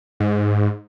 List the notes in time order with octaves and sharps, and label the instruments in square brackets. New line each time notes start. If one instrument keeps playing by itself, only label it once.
[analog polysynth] G#2